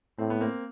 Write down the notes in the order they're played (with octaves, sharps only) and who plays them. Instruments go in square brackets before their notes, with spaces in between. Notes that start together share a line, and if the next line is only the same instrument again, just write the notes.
[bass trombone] A2 [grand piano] C4
[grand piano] B3
A#3 C4